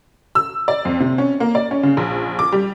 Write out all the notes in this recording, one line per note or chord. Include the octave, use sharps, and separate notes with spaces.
E6
D5
F2
C3
C#4
A#3
D5
C#4
C#3
A#1
D6
G3